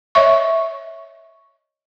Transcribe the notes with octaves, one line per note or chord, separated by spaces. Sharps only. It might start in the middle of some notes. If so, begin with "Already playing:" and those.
C#5 D#5 E5 C#6